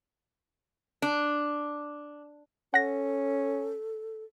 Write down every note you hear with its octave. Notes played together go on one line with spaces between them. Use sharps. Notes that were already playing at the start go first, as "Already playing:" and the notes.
D4
C#4 A4 F#5 A#6